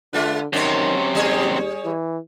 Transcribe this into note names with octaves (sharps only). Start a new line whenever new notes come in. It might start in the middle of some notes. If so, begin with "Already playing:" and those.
D3 G#3 F4 B4
F#2 C3 D#3 C#4 C#5
D#2 G3 G#4 C#5
E3